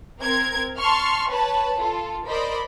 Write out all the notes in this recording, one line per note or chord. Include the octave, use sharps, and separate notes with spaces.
C4 A#4 G#6
A5 C6 C#6 F6
B4 C#5 A5 B5
F4 A4
A#4 C5 D5 D#5 B5